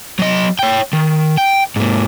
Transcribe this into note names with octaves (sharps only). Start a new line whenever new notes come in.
F#3 D#5
C#5 G5
D#3
G5
G#2 A#3